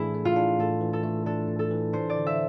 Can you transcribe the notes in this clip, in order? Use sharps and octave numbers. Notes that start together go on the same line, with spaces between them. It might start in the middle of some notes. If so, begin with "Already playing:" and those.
Already playing: A2 E3 A3 D4 E4 G#4
A3
F4
D4
A2 A4
E3
A4
A3
D4 A4
A2
A4
E3
D4 C5
D5
D3
E5